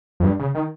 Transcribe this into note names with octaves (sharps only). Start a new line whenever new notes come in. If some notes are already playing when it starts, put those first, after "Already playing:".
F2
G2
C#3
D#3